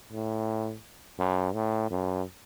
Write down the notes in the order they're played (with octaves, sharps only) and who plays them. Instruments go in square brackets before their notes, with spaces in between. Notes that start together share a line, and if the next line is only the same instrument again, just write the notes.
[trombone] A2
F#2
A2
F#2